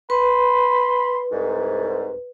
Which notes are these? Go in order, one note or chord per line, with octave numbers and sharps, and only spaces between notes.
B4 B5 C6
C2 G#2